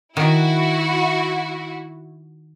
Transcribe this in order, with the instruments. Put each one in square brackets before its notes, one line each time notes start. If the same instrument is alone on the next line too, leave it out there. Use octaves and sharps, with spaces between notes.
[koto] D#3 [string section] E4 F#4